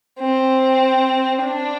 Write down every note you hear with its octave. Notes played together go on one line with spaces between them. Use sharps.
C4
D4